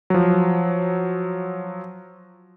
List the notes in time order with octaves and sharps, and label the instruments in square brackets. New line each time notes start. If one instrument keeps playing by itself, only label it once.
[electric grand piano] F3 F#3